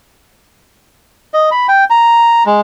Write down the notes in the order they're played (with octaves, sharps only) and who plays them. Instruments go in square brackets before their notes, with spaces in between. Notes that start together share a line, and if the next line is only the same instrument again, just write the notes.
[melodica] D#5
B5
G5
A#5
G#3